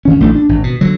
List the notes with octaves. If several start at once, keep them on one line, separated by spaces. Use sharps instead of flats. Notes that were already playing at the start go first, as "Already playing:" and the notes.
D2 D#3 C#4
A1 A3 D4
D4
G#1
B2
D3 F#3